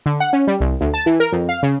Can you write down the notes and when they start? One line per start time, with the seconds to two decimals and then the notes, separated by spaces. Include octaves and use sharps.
0.06 D3
0.20 F#5
0.33 C#4
0.47 G3
0.61 C2
0.81 D2
0.94 A5
1.06 E3
1.20 A#4
1.32 F2
1.49 F5
1.63 C#3